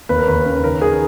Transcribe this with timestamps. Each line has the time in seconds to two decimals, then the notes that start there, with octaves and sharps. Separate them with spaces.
0.09 D#2 B4
0.19 A#4
0.28 D#2 B4
0.46 C#3
0.63 D#3 A#4
0.81 D#3 G#4